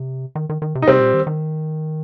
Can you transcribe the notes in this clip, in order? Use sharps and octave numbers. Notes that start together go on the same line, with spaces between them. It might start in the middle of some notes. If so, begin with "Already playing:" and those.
Already playing: C3
D#3
D#3
D#3
C3
D#4
C3 G3 C4
A#2
D#3
D#3